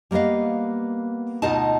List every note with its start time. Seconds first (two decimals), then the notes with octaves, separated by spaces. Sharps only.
0.11 G3 A#3 B3 D#5 F5
1.42 D2 B2 D#4 F4 D#5 A5